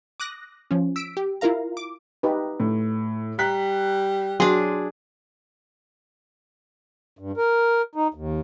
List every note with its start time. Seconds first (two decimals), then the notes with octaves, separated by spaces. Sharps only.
0.20 D6 D#6 F#6 A#6
0.71 F3 C#4
0.96 E6 B6 D7
1.17 G4
1.41 E4 F4 A#4 F5 A#5
1.77 D6
2.23 D#4 G4 B4
2.60 A2
3.39 G3 A#5 F#6 B6
4.40 F#3 D4 G#4 C6
7.19 G2
7.37 A#4
7.95 D#4
8.14 D#2